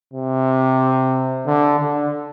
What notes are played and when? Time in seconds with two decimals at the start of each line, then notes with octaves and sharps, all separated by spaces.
0.13 C3
1.46 D3
1.79 D3